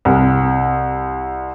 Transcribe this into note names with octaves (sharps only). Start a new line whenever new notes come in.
C2